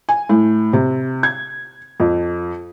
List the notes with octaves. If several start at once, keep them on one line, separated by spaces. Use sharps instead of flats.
G#5
A2
C3
G#6
F2